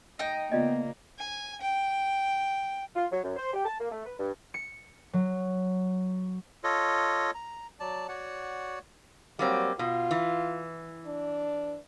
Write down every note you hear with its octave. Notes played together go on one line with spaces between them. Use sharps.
D#4 D#5 G5
C#3 A#3 B3 F4 D5 D#5
G#5
G5
F4
F#3
F#2
C5
G4
A5
A#3
A3
B4
G2
C#7
F#3
F4 A4 C#5 D#5
A#5
F#3 D5 A5
F#4 C#5 D5 F#5
F#3 G3 A#3 C4
B2 F4
E3
D4